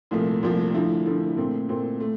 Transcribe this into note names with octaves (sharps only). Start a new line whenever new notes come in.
C2 A#2 F3 A3
C2 A#2 F3 A3
D3 F3 A3 E4
D3 F3 A3 E4
A#2 A3 C4
A#2 A3 C4
A3